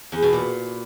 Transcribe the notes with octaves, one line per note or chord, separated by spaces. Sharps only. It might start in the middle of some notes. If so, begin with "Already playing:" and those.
E2
B2
A#2